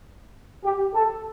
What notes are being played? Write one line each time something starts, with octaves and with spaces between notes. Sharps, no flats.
G4
A4